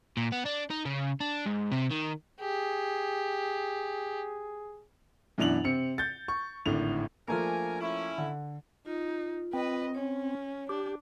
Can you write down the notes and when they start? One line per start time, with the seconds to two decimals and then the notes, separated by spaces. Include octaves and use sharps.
0.17 A#2
0.32 B3
0.45 D4
0.70 D#4
0.85 C#3
1.20 D4
1.46 G#2
1.72 C3
1.91 D#3
2.40 G4 G#4
5.38 F#2 B2 E3 D4 F7 F#7
5.64 C3 C4 C#7
5.98 G6 A6
6.28 C#6
6.66 G#1 A2 D3 F7
7.28 F3 A3 A#3 D4 A#4 G#5
7.81 C#4 E4
8.18 D3
8.86 D#4 F4
9.53 C4 B4 D#5
9.95 C#4 C#5
10.69 D4 G4 D6